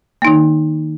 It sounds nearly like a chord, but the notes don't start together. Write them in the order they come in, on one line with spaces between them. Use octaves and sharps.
A#3 D#4 D#3